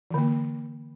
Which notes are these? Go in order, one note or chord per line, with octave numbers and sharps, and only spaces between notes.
D3 E3 A#3